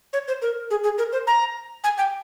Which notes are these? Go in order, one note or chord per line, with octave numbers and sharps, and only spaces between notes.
C#5
C5
A#4
G#4
G#4
A#4
C5
A#5
G#5
G5